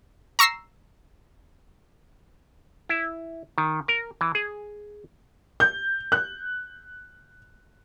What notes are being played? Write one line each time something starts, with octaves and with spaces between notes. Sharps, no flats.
A#5 C#6 E6 A#6 C7
E4
D#3
A#4
E3
G#4
G6
F#6